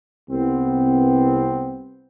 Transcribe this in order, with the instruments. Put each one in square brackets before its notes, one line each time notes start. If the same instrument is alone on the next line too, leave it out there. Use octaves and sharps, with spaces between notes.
[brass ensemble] C2 B3 C4